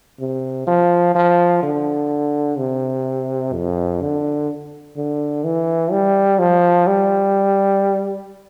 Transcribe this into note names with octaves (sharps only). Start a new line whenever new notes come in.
C3
F3
F3
D3
C3
F2
D3
D3
E3
G3
F3
G3